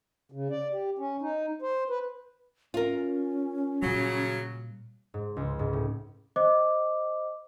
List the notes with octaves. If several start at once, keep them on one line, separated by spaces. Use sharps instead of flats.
C#3
D5
G4
C#4
D#4
C5
B4
C#4 F4 A#4
A#2 C#3 F#3 G3
G#2
C#2
G#2
A2
C5 D#5 D6